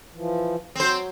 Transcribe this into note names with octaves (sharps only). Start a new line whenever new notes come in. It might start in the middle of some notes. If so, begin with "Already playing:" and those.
E3 F3
F#3 C4 C5